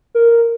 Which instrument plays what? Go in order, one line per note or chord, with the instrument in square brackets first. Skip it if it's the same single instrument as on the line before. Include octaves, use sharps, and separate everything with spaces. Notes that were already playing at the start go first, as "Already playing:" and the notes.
[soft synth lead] A#4